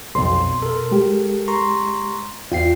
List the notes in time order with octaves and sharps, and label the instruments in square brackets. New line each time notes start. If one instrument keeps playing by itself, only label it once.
[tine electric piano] B1 F2 [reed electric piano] B2 C6
[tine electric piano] A4 A#4
[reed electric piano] G#3 G4
[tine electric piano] A#5 C6 C#6
[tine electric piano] E2 G5 C7 [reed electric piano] F4